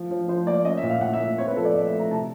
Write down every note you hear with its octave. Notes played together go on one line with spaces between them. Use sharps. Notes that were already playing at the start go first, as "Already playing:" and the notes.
Already playing: F3
F3
F3 C5
A#3 D5
C#4 D#5
E5
A#2
F5
A#2 F#5
E5
A#3
C4 C#5
B4
F3 A4
D5
A2 D#5
E5
A3
A#5
C3 A5